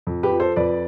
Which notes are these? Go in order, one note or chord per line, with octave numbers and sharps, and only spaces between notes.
F2
G4 B4
F3
A4 C5
F2 B4 D5